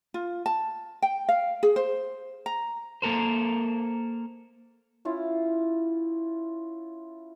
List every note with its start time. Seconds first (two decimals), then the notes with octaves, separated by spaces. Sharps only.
0.14 F4
0.46 A5
1.02 G5
1.29 F5
1.63 G#4
1.76 C5
2.46 A#5
3.02 A#3 A4 A#4 C5
5.05 C#4 E4 F4